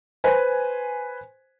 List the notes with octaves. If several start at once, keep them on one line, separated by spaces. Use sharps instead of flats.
B4 C5 G#5